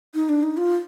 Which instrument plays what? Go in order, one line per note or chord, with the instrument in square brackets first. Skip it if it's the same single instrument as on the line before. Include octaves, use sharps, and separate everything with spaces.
[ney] D#4
D4
D#4
F4